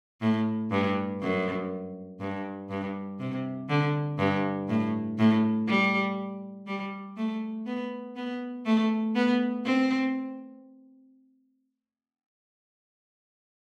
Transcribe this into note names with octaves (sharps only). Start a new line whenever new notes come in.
A2
G2
F#2
G2
G2
C3
D3
G2
A2
A2
G3
G3
A3
B3
B3
A3
B3
C4